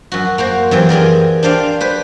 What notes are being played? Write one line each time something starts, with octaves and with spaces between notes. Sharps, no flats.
F#2 F#4
A#3 F#4 C5
F#2 E3 C4 G4
G4 G#4 A#4 D5
D4 G4 C5 D5 F5
B4 C5